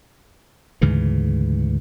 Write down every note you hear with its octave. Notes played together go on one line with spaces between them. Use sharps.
D2 G#2 C#3 E3